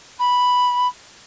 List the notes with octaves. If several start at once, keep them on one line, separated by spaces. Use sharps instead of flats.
B5